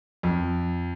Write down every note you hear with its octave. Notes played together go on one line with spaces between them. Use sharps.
F2